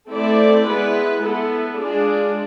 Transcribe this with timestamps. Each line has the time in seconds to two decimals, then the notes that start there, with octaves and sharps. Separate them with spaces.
0.10 A3 C4 E4 A4 D5
0.66 G#3 B3 E4 B4
1.22 B3 E4 A4
1.78 G#3 D4 F4 G#4